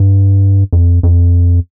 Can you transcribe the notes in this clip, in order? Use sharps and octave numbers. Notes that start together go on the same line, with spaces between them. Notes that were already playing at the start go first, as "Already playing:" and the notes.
Already playing: G2
F2
F2